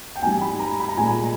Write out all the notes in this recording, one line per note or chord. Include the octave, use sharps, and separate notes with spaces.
G5
G#2 G3 G#5
B5
A#5
B5
A#5
A#2 G#3 G#5